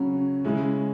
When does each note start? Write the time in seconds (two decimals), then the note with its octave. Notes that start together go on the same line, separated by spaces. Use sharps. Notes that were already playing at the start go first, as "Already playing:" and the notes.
Already playing: C#3 F#3 C#4
0.44 C#3 G#3 C#4 E4